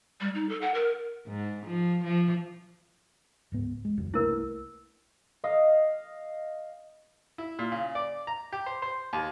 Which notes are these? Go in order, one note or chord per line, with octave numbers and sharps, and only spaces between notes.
G3
D#4
A4
F#5
A#4
G#2
F3
F3
D1 G#2 B3
G#3
D#1 C#2 F#2
C2 A3 A#3 E4 A#4 B4
D#5 F5
E4
A#2
C#3
D5
A#5
G4
C5
C5
D#2